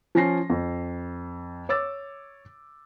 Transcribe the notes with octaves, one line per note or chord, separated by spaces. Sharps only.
F3 C#4 G#5 A#6 C7
F2
C#5 D6 E6 A6